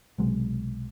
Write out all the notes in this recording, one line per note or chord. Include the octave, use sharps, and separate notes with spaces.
B1 C3 F#3 G#3